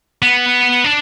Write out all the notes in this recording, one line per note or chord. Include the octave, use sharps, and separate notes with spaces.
B3
D4